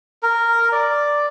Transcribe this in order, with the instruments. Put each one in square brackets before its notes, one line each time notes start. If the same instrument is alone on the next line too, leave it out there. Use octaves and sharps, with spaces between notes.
[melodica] A#4
D5